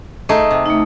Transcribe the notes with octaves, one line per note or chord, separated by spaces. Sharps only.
A3 D#4 G#4 D#5
C3
A3 D#4